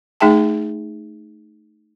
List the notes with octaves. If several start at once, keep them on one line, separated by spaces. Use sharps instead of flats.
A3 D#4 G#4 E5 G5 A5